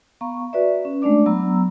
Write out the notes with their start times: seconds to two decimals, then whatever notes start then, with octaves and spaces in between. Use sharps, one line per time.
0.21 B3 F5 A#5 C#6
0.53 F#4 B4 D5 E5
0.85 C#4
1.02 G#3 A3 D4 D5 D6
1.26 F#3 B3 A#5 E6